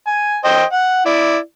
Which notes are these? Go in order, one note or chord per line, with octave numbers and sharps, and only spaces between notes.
G#5
C5 D#5 G5
F#5
E4 D5